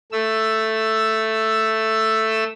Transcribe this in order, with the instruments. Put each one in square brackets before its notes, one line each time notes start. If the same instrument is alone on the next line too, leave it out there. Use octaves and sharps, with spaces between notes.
[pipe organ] A3 E6